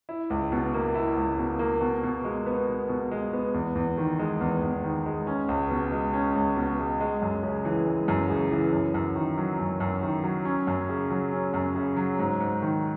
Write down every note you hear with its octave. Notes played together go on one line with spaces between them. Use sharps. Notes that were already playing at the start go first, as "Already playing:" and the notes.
E4
C#2
B2
A#3
E4
C#2
B2
A#3
B2
B2
G#3
B3
B2
B2
G#3
B3
E2
E2
D#3
G#3
E2
E2
D#3
G#3
C#4
C#2
B2
G#3
C#4
C#2
B2
G#3
G#3
F#2
C#3
E3
G#3
F#2
C#3
E3
F#2
F#2
D#3
F#3
F#2
F#2
D#3
F#3
C#4
F#2
C#3
F#3
C#4
F#2
C#3
F#3
G#2
G#2
D#3